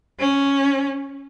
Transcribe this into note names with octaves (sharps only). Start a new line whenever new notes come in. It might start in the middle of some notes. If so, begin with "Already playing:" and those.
C#4